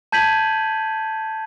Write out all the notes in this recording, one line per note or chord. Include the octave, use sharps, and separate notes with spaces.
A5 G6 G#6 B6 D#7 F#7